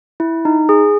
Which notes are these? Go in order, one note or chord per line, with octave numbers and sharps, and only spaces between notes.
E4
D#4
G#4